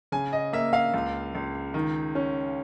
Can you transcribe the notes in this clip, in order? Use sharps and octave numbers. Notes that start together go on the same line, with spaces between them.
C#3 G#5
D#5
A#3 E5
F5
C#2
C#2
D#3
C#4